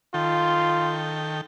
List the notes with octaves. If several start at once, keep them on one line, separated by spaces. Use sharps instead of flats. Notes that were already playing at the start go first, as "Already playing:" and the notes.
D#3 F4 A4 G5